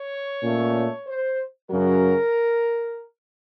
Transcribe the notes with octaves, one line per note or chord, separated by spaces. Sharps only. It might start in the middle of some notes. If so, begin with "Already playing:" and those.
Already playing: C#5
A#2 A3 C#4
C5
F#2 C#3 F#3 A#4